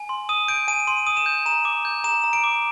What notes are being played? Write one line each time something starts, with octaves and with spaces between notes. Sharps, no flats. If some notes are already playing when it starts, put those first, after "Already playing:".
Already playing: G#5
C6
D#6 D#7
G6 D7
G#5 D#7
C6 D#7
D#6 D#7
E7
G6
A#5 E7
D6
G6
A#5 E7
A#5
D7
D6